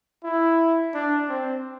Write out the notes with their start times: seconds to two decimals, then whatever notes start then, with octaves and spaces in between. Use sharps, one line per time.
0.24 E4
0.94 D4
1.29 C4